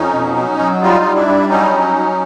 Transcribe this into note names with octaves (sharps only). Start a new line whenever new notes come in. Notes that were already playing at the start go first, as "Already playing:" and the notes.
Already playing: F2 C#4 D#4
B2
F#3
F#3
G3 D#4 F4
G3
D4 E4
G3
F#3 C#4 D#4
F#3
F#3